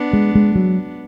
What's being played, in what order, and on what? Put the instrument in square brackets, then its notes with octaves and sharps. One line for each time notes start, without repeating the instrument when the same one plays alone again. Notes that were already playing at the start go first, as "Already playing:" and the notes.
Already playing: [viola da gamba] B3 D4
[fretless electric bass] G#3
G#3
F#3